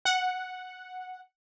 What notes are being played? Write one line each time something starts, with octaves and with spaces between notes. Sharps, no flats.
F#5